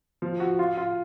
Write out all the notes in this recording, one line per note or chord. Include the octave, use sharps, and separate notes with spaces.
F3
F#4
F4
F4